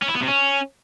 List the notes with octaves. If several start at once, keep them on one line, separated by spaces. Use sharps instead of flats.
C#4
E4
B3
C3
C#4